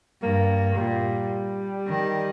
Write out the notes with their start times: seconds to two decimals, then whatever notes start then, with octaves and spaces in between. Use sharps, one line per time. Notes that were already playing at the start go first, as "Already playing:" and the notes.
0.22 G2 A#3
0.77 A#2 G3
1.87 D#3